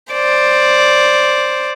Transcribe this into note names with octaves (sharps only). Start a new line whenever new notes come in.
C5 D5